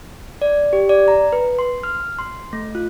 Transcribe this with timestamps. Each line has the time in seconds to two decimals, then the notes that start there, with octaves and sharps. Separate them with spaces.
0.42 D5
0.73 G4
0.89 D5
1.08 A#5
1.33 B4
1.59 C6
1.83 F6
2.19 C6
2.53 A3
2.75 F4